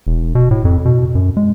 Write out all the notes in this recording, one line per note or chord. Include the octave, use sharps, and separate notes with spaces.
E1
B2
A2
F2
B2
F#2
G#3